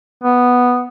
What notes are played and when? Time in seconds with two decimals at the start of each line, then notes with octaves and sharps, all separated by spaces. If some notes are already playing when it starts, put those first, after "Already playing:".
0.23 B3